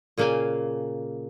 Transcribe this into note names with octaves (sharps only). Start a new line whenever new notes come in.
A#2 C#3 A#3 F5 G5 G#5